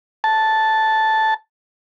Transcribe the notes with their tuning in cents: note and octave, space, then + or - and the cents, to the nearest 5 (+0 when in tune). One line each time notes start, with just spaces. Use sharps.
A5 -5